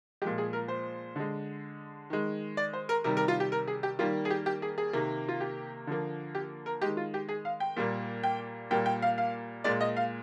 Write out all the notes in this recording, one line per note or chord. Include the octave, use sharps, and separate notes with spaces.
A#2 F3 G#3 G4
G#4
A#4
C5
D3 G#3
D#3 G#3
D5
C5
A#4
C3 D#3 G3 A#4
A#4
F4
G4
A#4
G#4
G4
D#3 G3 A#3 F4
G#4
G4
G4
G#4
G#4
C3 D#3 A#3
F4
G4
D3 F3 A#3
G4
A#4
D#3 G#3 G4
F4
G4
G#4
F5
G5
A#2 G3 A#3
G5
A#2 G3 A#3 G5
G5
F5
F5
A#2 G#3 D5
D#5
F5